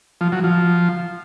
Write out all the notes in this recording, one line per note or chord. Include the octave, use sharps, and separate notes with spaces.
F3
F#3
F3